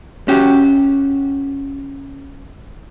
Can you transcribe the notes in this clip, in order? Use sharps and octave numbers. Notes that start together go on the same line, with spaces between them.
C#4 F#4 G4